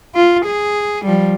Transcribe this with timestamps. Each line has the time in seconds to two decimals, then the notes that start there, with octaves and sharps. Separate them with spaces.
0.15 F4
0.46 G#4
1.05 F3 G3